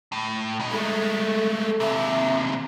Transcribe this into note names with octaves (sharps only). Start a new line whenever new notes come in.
A2
B2 D#4
G#3 A3 A4
D#2 C3 E5